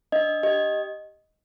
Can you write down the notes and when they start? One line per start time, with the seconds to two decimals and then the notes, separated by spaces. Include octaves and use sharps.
0.12 D4 D#5
0.43 G4 D#5